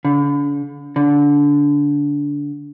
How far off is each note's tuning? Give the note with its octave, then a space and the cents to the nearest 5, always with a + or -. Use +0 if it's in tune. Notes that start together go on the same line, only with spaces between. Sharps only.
D3 -40
D3 -20